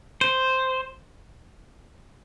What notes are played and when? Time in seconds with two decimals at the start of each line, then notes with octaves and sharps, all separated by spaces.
0.21 C5